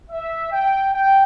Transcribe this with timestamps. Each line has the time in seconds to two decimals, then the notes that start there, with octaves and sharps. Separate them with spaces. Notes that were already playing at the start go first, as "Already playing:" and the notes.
0.10 E5
0.52 G5
0.93 G5